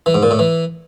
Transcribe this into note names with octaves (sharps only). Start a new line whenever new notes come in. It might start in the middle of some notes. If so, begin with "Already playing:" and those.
E3
G#2
A#2
A2
E3